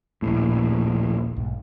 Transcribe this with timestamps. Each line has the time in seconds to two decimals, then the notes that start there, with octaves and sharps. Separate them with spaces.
0.22 D#1 A#1 A2 A#3
1.36 B1 G#2